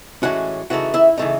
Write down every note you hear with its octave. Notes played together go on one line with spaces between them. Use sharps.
A2 E3 G#3 C#4 F#4 F#5
C#3 E3 A3 D#4 F#4 F#5
E4 E5
C#3 E3 A3 D#4